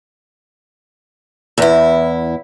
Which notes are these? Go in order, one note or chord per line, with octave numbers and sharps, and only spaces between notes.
E2 E4